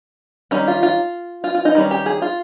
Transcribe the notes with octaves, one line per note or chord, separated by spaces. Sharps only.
D#3 G3 C#4 D#4
F4
F4
F4
F4
D#4
D#3 G3 C#4
G4
G#4
F4